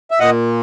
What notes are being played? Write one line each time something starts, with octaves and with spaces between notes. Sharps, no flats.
E5
A#2 D#5 F#5